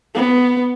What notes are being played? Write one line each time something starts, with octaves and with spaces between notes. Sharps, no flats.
B3